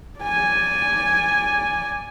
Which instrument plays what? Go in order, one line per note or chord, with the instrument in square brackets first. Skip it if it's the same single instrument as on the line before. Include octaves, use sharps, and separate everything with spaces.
[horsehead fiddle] D5 G#5